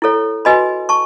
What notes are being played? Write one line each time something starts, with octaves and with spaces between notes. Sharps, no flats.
E4 A4 C#5
F#4 B4 D#5 G#5 B5
A5 C#6